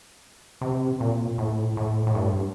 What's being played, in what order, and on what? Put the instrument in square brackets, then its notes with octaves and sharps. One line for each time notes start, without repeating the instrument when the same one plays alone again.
[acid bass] C3
A#2
A2
A2
A2
G2